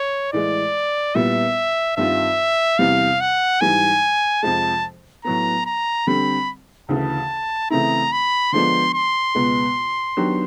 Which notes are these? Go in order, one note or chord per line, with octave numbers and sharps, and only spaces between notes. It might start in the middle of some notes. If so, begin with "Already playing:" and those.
Already playing: C#5
A2 E3 G#3 D5
A#2 G3 B3 E4 E5
G2 D#3 G3 C4 F4 E5
E2 C3 E3 G3 F5
F#5
G#2 E3 G3 G#5
F2 C3 F3 G#3 A5
A2 F#3 B3 A#5
A#5
D3 G3 C4 B5
D2 C#3 E3 A5
C#3 E3 A3 C4 E4 A#5
B5
D3 F3 G#3 B3 D4 C6
C6
C#2 B2 G#3 B3
D#3 F#3 B3 D4 G4